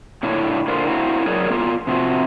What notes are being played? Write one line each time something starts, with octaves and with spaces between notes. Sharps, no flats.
A#2 D3 D4 E4 C#5
D3 F4 A#4 C5
A#3 C4 E4 F#4
F#3 G#4 A#4 C#5 D5
A#3 B3 F4 A#4
C3 F3 C4 F#4